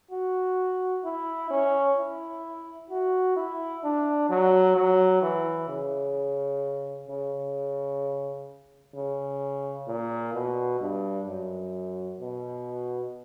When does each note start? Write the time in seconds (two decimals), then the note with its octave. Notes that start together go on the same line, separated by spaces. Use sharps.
0.11 F#4
1.04 E4
1.51 C#4
1.98 E4
2.90 F#4
3.36 E4
3.84 D4
4.30 F#3
4.76 F#3
5.22 E3
5.69 C#3
7.08 C#3
8.95 C#3
9.88 A#2
10.34 B2
10.80 G2
11.27 F#2
12.20 B2